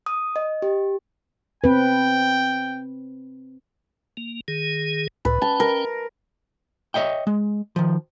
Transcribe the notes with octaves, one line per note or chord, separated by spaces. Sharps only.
D#6
D#5
G4
C4 B4 G5
A#3
D#3 G#4
C#2 A2 B4
C#4 G5 A5
A#4
C#5 D#5 E5 G5
G#3
D#3 F3